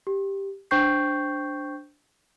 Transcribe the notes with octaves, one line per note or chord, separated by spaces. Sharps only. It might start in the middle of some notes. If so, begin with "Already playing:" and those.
G4
D4 C5 G5 C#6 G6 C7